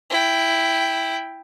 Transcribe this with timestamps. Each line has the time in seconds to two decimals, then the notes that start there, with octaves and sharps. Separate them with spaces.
0.10 E4 G5